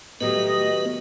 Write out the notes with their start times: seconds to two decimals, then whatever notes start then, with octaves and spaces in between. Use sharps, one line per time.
0.21 A2 D#3 F#3 A3 B3 G4 B4 D#5